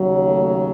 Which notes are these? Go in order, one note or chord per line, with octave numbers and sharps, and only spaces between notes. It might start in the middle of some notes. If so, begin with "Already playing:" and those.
Already playing: D#2 C#3 F#3
A3